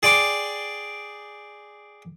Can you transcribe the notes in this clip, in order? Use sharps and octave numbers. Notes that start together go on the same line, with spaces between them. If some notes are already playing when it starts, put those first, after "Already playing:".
G#4 D5 G5 C6 D6